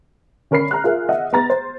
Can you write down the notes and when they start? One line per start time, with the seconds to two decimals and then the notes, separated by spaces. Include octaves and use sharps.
0.51 D3 C#4 A#4 B5 C7
0.71 A#5 F6 F#6
0.84 F4 G#4 A#4 E5
1.09 D#5 E5 F#5
1.33 B3 A#5 A6
1.50 C5